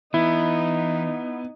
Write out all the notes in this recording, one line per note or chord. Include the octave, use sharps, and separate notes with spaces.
E3 B3 D#4 E4